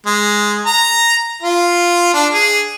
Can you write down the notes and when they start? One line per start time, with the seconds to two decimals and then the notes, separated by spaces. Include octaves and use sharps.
0.07 G#3
0.66 A#5
1.42 F4
2.14 D4
2.33 G#4